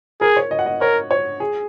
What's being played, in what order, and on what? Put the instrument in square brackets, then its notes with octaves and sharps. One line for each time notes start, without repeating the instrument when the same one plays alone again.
[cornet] G#4 [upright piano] A#4
[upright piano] C#5
D#5
F#5
D#5
[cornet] A#4 [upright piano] C#5
[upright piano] C#5
G#4